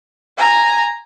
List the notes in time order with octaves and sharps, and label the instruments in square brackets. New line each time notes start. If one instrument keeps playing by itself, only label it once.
[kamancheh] G#5 A#5